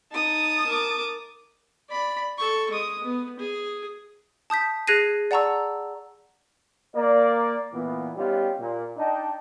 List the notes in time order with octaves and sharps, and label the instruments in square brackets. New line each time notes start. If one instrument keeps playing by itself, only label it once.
[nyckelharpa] D#4 [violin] A5 D#6
[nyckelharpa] A#4 D6
D5 B5
A4 C#6
G#3 D#6
B3
G#4
[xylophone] A5 D#6 G6 B6
G#4 F#6 G#6 A#6 C7 D#7
D5 F#5 A5 A#5 C#6 E6
[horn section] A#3 D5 A#5
A#2 E3 B3
G3 B3 C#4 D#4 F4 G4
A#2
D4 D#4 D5 D#5 G5 A5